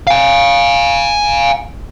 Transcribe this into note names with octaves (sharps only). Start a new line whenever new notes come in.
F5 G#5